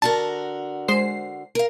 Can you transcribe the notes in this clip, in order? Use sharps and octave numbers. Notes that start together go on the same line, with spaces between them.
D3 F#4 A#4 A5
G#3 C5 C7
A#4 F5